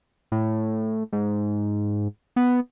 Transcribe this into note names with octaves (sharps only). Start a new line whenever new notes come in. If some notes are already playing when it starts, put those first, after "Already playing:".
A2
G#2
B3